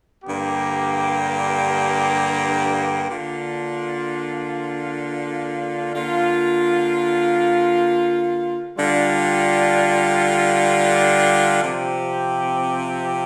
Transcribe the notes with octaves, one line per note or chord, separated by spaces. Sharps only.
G2 D3 A#3 G4
D3 A#3 D4 F4
D3 A#3 F4
D3 G3 D4 F4
C3 F3 C4 G4